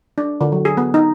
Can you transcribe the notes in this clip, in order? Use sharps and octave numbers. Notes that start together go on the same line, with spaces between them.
D4
D3
F#3
G#4
B3
D#4